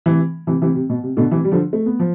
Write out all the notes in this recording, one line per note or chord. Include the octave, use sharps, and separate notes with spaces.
C3 E3
C3 E3
C3 E3
C3
B2
C3
B2 D3
C3 E3
G3
D3 F3
A3
B3
F3